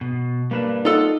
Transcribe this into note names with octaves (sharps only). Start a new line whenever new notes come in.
B2
G3 A#3 D4 B4 E7
D#4 F4 A4 F#5